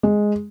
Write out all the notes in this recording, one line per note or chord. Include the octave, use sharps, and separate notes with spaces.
G#3